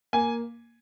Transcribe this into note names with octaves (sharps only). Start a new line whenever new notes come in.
A#3 G#5